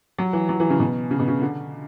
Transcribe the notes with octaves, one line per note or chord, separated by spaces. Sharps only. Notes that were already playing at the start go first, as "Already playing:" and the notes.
F#3
E3
F#3
E3
C#3
B2
C#3
B2
C#3
D3